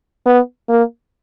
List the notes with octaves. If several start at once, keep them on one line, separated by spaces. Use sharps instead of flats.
B3
A#3